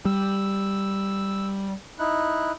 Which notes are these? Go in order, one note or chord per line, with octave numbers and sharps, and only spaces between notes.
G3 E6
D#4 E4 F#6